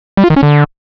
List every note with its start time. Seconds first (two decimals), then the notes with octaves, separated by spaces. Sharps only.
0.17 G3
0.24 F4
0.30 D#3
0.36 C#4
0.43 D3